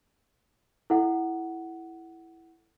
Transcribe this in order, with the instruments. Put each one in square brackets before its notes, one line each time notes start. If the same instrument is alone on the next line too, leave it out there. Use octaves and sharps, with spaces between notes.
[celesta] E4 A4 F#5